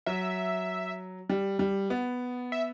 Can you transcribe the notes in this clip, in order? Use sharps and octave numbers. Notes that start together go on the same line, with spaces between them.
F#3 E5
G3
G3
B3
E5